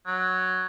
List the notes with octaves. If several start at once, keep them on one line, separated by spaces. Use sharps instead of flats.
F#3